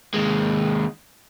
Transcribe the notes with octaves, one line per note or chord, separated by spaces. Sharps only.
D#2 G#3